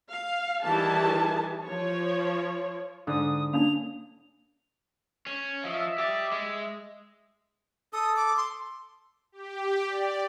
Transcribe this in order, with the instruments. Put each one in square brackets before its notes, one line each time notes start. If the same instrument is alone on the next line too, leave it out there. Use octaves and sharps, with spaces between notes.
[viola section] F5
D#3 E3 G3 G4 G#4 A5
F3 C#5
[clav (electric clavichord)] G#2 D3 [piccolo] D#6
[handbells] A#3 C#4 D4 [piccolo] F7
[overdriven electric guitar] C#4
[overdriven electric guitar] F3 [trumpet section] D#5 E5
[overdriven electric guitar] G4 D5
G#3
[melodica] A4 [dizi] D#6
[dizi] D6
C6
[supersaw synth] G4
D5